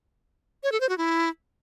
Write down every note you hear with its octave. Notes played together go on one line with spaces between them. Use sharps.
C#5
A4
C5
F#4
E4